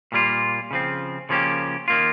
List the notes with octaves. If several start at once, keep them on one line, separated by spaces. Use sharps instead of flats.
A#2 G3 A#3 F4
C#3 F3 C4
C#3 F3 A#3 C#4 G4
D#3 A#3 F4